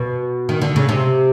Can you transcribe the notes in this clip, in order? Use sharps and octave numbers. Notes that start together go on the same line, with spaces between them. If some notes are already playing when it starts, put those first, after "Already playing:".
Already playing: B2
D#3
D3
C#3
C3